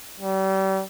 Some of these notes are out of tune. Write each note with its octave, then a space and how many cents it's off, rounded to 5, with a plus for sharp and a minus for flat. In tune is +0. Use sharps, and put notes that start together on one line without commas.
G3 -35